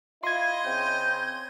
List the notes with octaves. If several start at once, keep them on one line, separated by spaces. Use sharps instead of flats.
E4 F4 D#5 C6 G#6
C#3 C4 G6